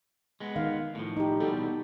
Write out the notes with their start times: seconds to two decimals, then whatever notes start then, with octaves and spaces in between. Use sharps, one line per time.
0.40 G#3 B3
0.56 D#3 F5
0.95 A2 F3
1.17 D#4 G4
1.40 E2 B2 G3 A4